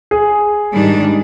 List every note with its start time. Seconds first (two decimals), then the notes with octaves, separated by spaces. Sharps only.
0.11 G#4
0.73 G#2 D#3 G3 D4